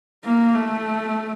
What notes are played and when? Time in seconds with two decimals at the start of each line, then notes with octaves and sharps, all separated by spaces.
0.25 A#3
0.55 A3